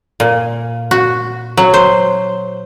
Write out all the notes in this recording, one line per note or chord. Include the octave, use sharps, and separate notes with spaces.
A#2
F#4
F#3
C5